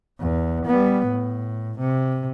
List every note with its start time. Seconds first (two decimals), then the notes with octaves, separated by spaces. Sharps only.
0.20 E2
0.66 G3 B3
1.06 A2
1.79 C3